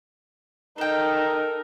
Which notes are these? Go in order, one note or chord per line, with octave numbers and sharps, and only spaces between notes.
D#4 A4 A#4 G5